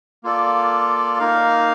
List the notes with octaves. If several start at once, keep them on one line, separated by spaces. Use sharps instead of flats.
A#3 F4 A4 D5
A#3 D#4 A#4 F5